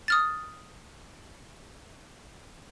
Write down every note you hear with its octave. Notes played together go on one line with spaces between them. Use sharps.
D#6 F6 A6